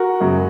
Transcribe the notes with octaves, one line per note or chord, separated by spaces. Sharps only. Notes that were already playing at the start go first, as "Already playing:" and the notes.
Already playing: F#4 A#4
F#2 C#3 F#3